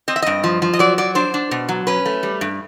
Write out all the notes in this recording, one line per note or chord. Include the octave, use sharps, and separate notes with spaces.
C4 D#5
E5
G2 D#5
F3
F3
D#5
F#3 D5
F#3 D5
D4 C5
D4
B2
F#3
C#4 B4
A3
G3
G2